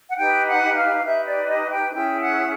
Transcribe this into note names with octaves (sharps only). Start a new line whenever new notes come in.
F#5
D#4 G4 B4 G5
F#5
F5
D#4 G4 B4 E5
D5
D#5
G5
C#4 E4 G#4 G5
F#5